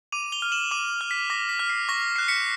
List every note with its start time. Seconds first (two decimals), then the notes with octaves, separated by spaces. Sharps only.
0.12 D6 D#7 F7
0.32 F7 G7
0.42 F6
0.52 E7 F#7
0.71 D6 D#7 F7
1.01 F6
1.11 B6
1.30 D6 A#6
1.49 B6
1.59 F6
1.70 C7
1.88 C#6 A#6
2.16 F#6 C7
2.28 B6 C#7